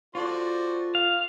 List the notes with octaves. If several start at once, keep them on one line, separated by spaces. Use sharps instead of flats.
F4 F#4 A4 C5 D5
F5